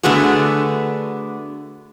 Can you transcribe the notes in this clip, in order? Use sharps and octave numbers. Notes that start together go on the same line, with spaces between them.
D3 A3 B3 F#4 G#4